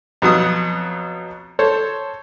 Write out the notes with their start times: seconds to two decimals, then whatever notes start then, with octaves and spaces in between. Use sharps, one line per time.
0.22 F2 B2 F#3 D#6 F#6
1.59 A4 C5 C#5